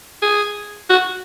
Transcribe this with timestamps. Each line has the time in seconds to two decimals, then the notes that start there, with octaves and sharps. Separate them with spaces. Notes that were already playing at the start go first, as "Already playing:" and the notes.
0.22 G#4
0.90 F#4